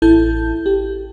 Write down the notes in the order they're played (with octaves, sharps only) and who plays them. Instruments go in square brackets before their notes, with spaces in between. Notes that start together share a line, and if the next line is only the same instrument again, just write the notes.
[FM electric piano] A1 E4 A4 A5 G6
G4